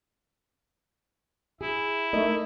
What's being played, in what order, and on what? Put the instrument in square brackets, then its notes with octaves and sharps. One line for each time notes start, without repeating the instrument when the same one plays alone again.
[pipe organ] E4 [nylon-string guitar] G#4
[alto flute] A3 [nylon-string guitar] D#4 A#4 D#5